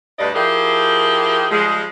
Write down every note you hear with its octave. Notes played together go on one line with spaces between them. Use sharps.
D2 G2 B4 D5 D#5
F3 E4 G4 G#4 A#4
F3 G3 G#3